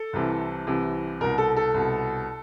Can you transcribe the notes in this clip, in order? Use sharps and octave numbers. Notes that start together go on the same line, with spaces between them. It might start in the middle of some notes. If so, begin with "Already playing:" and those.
Already playing: A4
C2 C3 E3
C2 C3 E3
C2 B2 A#4
A4
A4
C2 B2